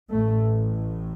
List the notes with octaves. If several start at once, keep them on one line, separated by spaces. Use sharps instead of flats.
A1 A2 A3